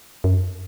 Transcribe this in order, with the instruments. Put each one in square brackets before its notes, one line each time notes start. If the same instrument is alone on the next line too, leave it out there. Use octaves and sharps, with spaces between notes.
[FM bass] F#2